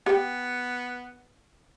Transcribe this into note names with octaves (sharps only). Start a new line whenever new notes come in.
B3 G4 B4 G5